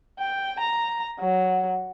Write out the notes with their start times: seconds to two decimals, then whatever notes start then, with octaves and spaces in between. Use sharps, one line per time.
0.20 G5
0.60 A#5
1.20 F#3